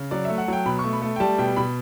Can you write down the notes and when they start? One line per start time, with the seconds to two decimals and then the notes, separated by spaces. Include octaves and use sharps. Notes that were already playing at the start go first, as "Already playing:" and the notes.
Already playing: C#3
0.11 F#3 D5
0.25 A3 E5
0.38 F#5
0.48 F#3 G5
0.66 B2 B5
0.79 A3 C#6
0.93 B5
1.02 A3
1.16 G5
1.20 G3 A5
1.38 B2 G5
1.56 B2 B5